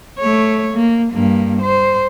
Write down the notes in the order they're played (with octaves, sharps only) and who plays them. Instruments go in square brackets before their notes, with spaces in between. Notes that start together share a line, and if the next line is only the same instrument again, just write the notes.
[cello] A3 C#5
A#3
G2 A#3
C5